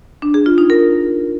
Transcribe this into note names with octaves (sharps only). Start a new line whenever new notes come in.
D4
G#4
F4
D#4
A#4